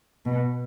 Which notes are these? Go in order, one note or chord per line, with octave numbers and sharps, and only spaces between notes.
B2